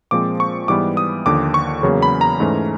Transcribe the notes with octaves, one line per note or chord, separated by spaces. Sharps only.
A#2 F3 G#3 C4 D6
C#6
G#2 E3 G3 B3 D6
D#6
D#2 D3 F3 D6
C#6
E2 C#3 F#3 A#3 C#4
B5
A#5
G#2 E3 A3 C#4